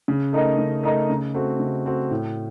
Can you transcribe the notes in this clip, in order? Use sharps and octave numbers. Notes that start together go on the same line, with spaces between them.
C#3
A3 D#4 A#4 D#5
C#3
A3 D#4 A#4 D#5
C#3
A3 C4 F#4
C#3
A3 C4 F#4
A2